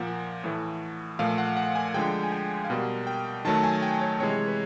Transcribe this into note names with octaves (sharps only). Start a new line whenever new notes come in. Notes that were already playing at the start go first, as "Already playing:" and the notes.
Already playing: A#2 F3 A#3 F#5
A2 E3 A3
A#2 F3 A3 F5
F#5
F#5
G#5
D3 F3 G#3 G5
G#5
G5
F5
B2 G3 A#3 F#5
G5
D#3 F#3 A3 A5
G#5
G5
C#5
C3 E3 G#3 C#5
B4